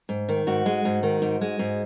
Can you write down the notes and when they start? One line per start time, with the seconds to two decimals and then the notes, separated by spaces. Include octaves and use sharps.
0.09 G#2
0.29 D#3
0.47 G#2 F#4
0.66 G#3
0.85 G#2
1.03 D#3
1.22 G#2
1.41 G#3
1.59 G#2